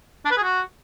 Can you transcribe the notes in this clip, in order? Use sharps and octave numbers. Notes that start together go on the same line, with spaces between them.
D4
B4
G#4
F#4